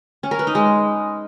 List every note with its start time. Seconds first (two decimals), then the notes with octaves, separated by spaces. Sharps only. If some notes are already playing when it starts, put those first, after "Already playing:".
0.23 C#4
0.31 A#4
0.39 B4
0.47 D#4
0.55 G#3